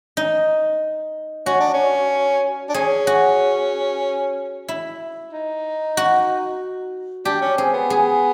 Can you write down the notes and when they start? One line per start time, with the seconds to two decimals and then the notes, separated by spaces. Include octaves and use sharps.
0.17 D#4
1.46 C#4 F#4
1.60 D4
1.74 C#4
2.69 D4
2.74 C#4 G#4
3.07 F#4
4.69 E4
5.33 D#4
5.97 F#4
7.25 D4 G4
7.42 C#4
7.57 C4 G#4
7.73 B3
7.90 G#4